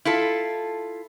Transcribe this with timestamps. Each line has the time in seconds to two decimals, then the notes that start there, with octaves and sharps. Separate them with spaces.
0.05 E4 F4 A4